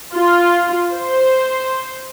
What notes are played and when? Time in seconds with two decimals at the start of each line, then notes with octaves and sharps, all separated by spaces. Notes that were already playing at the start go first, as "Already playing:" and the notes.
0.14 F4
0.92 C5